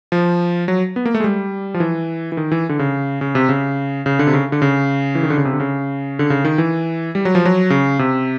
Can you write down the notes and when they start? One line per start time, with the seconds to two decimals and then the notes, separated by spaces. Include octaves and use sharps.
0.12 F3
0.68 F#3
0.96 B3
1.05 A#3
1.15 A3
1.20 G#3
1.24 G3
1.74 F3
1.80 E3
2.32 E3
2.37 D#3
2.52 E3
2.69 D3
2.79 C#3
3.21 C#3
3.35 C3
3.49 C#3
4.06 C#3
4.19 D3
4.27 C3
4.33 C#3
4.52 D3
4.62 C#3
5.15 E3
5.23 D#3
5.30 D3
5.38 C#3
5.45 C3
5.53 D3
5.60 C#3
6.19 D3
6.30 C#3
6.45 D#3
6.58 E3
7.15 G3
7.25 F#3
7.35 F3
7.45 F#3
7.70 C#3
7.99 C3